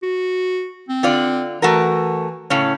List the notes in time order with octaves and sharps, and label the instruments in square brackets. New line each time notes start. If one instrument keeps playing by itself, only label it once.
[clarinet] F#4
C4
[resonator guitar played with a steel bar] D3 F4 D5
[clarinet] E3 [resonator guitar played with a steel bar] A3 F#4 A#4
[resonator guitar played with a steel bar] A2 C#3 C#4